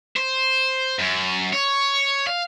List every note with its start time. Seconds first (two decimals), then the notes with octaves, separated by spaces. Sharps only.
0.16 C5
0.99 F#2
1.53 C#5
2.27 F5